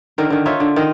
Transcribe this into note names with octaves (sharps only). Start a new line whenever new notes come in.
D3 D#3 A#4
D3 D#3
D#4 F4 C#5 E5
D3
D#3 D#5